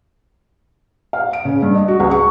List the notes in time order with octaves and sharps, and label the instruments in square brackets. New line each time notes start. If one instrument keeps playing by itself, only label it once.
[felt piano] F5
D7
C#3
G2
D#5
F#4
C#2
C#6